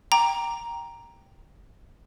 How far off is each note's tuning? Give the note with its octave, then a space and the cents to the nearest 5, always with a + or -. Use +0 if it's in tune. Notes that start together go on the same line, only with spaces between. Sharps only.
G5 +0 A#5 +5 D6 +0